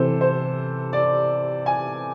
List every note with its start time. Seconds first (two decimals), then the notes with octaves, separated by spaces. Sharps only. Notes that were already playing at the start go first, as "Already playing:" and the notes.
Already playing: C3 E3 A4 C5
0.21 C5
0.93 D5
1.66 G#5